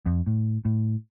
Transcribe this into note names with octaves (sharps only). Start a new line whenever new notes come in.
F2
A2
A2